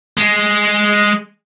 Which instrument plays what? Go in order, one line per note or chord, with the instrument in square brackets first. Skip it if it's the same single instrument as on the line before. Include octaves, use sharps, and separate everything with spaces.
[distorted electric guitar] G#3